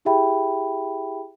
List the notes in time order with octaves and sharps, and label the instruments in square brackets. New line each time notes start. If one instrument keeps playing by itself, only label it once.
[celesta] E4 G4 G#4 E5 G5 B5